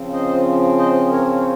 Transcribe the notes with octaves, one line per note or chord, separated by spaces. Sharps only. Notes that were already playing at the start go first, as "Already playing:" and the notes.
Already playing: C#3 F3 C4
C5 D#5
C5 D#5
A#4 C#5
C#5